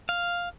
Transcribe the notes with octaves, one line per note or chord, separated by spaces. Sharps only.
F5